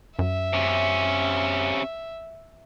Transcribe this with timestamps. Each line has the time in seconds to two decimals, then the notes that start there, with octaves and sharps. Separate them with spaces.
0.19 F#2 E5
0.53 C3 C#4